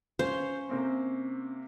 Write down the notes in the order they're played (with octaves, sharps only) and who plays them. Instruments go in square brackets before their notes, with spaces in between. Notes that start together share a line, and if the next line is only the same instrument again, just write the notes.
[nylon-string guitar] C#4 F5 [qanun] C5
[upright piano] C3 A#3 C4